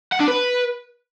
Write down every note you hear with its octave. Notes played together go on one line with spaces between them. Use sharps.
F#5
D4
B4